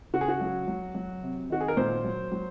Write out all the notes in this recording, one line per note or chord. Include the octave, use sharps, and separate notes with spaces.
C#3 F#4
G#4
F#4
F#3
F#3
F#3
C3
D#3 F#4
G#4
A#4
A#2 C5
F#3
F#3